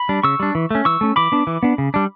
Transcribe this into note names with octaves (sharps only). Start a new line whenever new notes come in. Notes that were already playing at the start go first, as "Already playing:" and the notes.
Already playing: B5
G3 D4
C#3 C#6 E6
G3 D4
E3
A3 C#4
E3 C#6 E6
A3 C#4
E3 B5 D6
B3 D4
E3
B3 D4
C#3
G3 D4